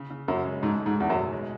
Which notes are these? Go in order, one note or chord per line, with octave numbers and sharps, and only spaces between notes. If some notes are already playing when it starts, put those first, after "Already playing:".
Already playing: C#3
C#3
F#2 C#3
G#3
G#2 A3
D#4
G#2
E2 A3
F#2
B2
G#3